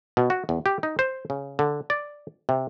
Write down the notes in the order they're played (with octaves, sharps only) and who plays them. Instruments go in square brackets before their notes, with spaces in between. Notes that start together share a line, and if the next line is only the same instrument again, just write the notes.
[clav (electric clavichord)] B2
F#4
E2
G4
D#4
C5
C#3
D3
D5
C3